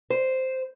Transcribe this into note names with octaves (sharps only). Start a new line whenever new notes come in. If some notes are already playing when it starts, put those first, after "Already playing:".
C5